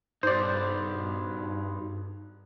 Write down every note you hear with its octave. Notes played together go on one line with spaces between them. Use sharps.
G2 D#4 F#4 C5 D5